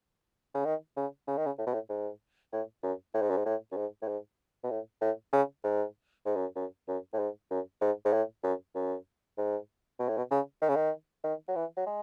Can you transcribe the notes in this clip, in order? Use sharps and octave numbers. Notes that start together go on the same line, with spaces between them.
C#3
D#3
C#3
C#3
D#3
C#3
A2
B2
A2
G#2
A2
F#2
A2
G#2
F#2
G#2
A2
F#2
G#2
A2
G#2
B2
A2
A2
C#3
G#2
G#2
F#2
F#2
F#2
A2
G#2
F#2
G#2
G#2
A2
F#2
F#2
G#2
B2
A2
B2
C#3
D#3
C#3
D#3
D#3
F#3
E3
F#3
G#3